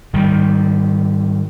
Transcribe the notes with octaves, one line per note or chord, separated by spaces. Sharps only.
G#2 D#3 G3